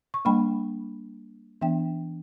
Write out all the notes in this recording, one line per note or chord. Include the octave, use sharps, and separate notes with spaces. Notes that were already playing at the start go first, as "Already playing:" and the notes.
C#6
G3 A#3 D4 G5 B5
E3 B3 D4 E5 G5